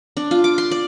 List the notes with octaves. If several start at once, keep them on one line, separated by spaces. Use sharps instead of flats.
D4
F4
D6
C6
D5